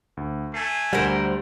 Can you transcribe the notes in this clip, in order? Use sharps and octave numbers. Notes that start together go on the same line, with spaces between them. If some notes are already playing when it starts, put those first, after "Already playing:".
D2
A3 G#5 C7
D2 G3 A#4 C5 F#5